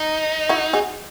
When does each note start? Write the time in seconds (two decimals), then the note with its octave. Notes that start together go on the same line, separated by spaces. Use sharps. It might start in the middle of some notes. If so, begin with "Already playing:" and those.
Already playing: D#4
0.49 E4 F#4
0.73 F#4 G#4